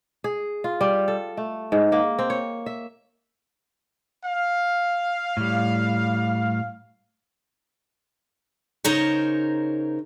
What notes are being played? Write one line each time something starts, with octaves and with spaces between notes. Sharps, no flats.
G#4
F4
G3
A4
A3
G#2
A#3
C4
C#5
E5
F5
A2 G3
C#3 D#4 A#4 C5 C#5